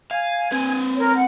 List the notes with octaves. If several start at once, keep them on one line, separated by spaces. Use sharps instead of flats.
F5 G#5 G#6
C4 B4
A#4 C#5
F#5